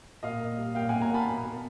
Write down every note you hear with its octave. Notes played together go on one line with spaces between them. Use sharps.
A#2 D#5 F5
A#3
G3
A#2 F5 G5
A#2 F#5 G#5
G#5 A#5
A#3 A5 B5
B2
A#3